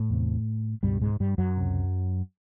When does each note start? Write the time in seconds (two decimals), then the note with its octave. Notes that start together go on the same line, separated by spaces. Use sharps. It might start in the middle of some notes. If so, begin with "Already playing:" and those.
Already playing: A2 A3
0.10 E2 C3
0.83 C#2 G2 B2 G3
1.02 G#2 G#3
1.20 G2 G3
1.38 F#2 F#3
1.57 C#2 C3